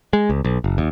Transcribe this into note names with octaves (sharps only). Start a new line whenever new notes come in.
G#3
C#2
B1
F#1
D#2